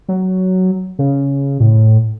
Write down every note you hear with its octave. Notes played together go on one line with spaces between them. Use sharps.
F#3
C#3
A2